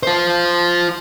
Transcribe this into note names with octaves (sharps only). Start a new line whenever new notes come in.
F4 C5